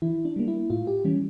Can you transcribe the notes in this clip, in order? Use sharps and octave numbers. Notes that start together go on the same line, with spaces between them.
E3 E4
D4
G3 A#3
E4
A2 F4
G4
E3 G3 C#4